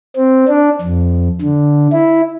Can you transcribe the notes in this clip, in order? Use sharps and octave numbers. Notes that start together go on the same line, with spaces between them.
C4
D4
F2
D3
E4